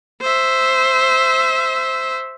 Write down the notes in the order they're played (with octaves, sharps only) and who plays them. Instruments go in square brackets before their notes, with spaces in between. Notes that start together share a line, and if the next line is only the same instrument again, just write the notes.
[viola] C5 E5